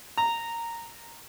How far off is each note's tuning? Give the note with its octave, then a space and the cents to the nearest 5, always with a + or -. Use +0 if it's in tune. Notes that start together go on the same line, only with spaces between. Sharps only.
A#5 -10